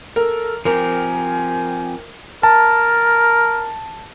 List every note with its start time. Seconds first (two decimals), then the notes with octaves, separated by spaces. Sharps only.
0.16 A4 A#4
0.65 F3 C4 G4 A#4 G#5
2.43 A#4 A5